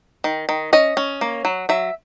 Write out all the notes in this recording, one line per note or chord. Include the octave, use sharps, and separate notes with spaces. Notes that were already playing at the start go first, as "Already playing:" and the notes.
D#3
D#3
C#4 D#5
C#4
A#3
F#3
F#3 E5